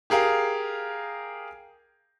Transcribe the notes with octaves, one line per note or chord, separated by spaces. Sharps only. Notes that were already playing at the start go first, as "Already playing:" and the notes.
G4 G#4 A#4 F5